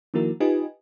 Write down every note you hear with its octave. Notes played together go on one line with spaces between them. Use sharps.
D#3 F3 A#3 E4 F#4 A#4
D#4 F4 G4 B4 D#5 G#5